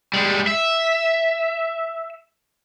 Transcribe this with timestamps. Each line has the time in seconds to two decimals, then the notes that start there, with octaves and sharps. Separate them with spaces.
0.14 G3 G#3
0.47 E5